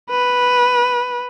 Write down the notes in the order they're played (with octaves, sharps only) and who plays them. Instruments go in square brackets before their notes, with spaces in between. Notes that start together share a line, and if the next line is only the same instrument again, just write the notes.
[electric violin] B4